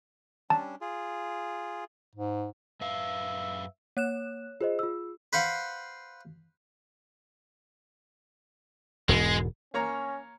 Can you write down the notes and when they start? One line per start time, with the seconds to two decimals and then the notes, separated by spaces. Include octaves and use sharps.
0.50 G3 C#4 D4 A5
0.81 F4 G#4
2.15 G#2
2.81 F#2 B4 E5 F5
3.97 A#3 C#5 F#6 E7
4.61 F4 G#4 C5 D#5
4.79 F4 E6
5.33 B4 C5 F5 F#5
9.09 E1 G#2 B2 G#3
9.74 A#3 C#4 C#5 A#5